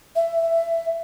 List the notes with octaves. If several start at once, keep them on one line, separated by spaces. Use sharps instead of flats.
E5